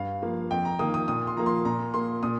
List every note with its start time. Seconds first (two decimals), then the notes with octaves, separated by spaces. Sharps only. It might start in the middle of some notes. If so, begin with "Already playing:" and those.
Already playing: G2 F5
0.22 F3 A#3
0.51 F2 G5
0.65 A#5
0.79 D#3 A#3 D#6
0.94 D#6
1.08 A#2 D#6
1.27 C6
1.37 F3 A#3 A#5
1.46 C6
1.65 A#2 A#5
1.94 A#3 C6
2.23 A#2 D#6